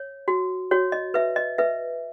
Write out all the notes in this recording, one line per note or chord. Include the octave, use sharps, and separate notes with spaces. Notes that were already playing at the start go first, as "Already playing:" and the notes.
Already playing: C#5
F#4
F#4 C#5
D#5
B4 E5
D#5
B4 E5